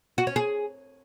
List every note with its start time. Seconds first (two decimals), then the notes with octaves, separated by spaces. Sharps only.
0.18 F#4
0.27 C#4
0.36 G#4